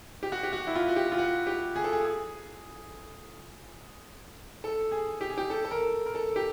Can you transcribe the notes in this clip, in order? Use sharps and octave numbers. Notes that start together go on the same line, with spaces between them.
G4
F#4
G4
F#4
E4
F4
F#4
G4
F4
F#4
G4
G#4
A4
G#4
G#4
A4
G#4
G4
G#4
G4
A4
A4
A#4
A#4
A4
G4